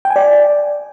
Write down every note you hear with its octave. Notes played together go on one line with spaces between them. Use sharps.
G5
G#5
D5